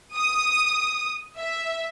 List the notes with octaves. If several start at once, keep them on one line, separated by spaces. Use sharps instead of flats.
D#6
E5